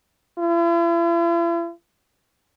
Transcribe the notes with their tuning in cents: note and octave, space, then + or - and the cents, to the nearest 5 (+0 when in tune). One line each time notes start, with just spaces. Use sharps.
E4 +45